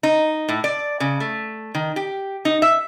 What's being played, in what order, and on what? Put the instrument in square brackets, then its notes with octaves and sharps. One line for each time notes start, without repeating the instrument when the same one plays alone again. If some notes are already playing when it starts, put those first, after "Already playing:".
[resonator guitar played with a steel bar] D#4
A2
D5
C#3
A3
D#3
G4
D#4
E5